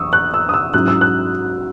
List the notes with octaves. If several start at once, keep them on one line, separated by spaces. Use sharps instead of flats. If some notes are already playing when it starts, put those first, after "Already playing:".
Already playing: E2 C#6 D#6 E6
F#6
E6
D#6
E6
G#2 F#3 C#4 E4 F#6
E6
F#6